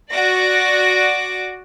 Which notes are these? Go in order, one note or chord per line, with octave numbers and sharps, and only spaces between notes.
F#4 D5 D6 A#6